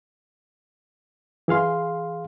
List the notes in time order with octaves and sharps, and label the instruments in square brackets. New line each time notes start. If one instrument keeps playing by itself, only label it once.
[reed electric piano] E3 G#4 F5 C6